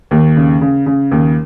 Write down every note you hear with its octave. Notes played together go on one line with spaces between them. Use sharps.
D#2
C#3
C#3
C#3
D#2